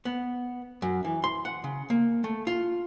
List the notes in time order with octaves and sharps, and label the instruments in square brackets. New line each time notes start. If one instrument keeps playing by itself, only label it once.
[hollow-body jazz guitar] B3
F#2
E3
C6
F#5
C#3
A#3
A3
F4